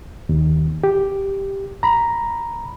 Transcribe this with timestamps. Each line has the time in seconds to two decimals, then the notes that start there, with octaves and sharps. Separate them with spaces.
0.29 D#2
0.84 G4
1.83 A#5 B5